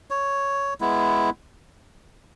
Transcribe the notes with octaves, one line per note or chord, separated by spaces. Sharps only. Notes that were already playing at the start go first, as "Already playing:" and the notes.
C#5
G#3 B3 E4